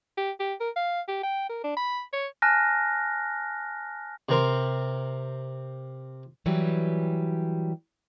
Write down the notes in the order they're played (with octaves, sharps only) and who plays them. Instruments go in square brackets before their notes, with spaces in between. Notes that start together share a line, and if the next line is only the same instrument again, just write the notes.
[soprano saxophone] G4
G4
A#4
F5
G4
G5
A#4
D4
B5
C#5
[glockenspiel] G#5 A5 F6 F#6 A#6
[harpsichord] C3 C4 A#4 C6
[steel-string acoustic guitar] E3 F#3 G3 G4 B4